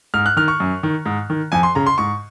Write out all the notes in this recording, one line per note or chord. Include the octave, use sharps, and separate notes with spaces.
G#2 F6
F#6
D#3 F6
C#6
F#2
D#3
G#2
D#3
F2 G#5
C6
C#3 A#5
C6
G#2 C#6